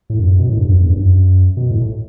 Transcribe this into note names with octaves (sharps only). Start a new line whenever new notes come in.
A2
F#2
B2
A2
G2
F#2
E2
G2
F#2
B2
A2
A2